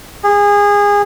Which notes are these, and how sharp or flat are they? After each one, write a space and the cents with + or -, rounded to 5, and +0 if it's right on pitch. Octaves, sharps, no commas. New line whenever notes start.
G#4 -25